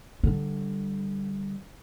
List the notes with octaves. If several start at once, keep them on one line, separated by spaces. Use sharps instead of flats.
D3 G3